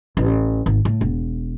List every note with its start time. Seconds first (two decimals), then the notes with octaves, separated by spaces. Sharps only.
0.17 A1
0.66 G#1
0.85 A2
1.01 E1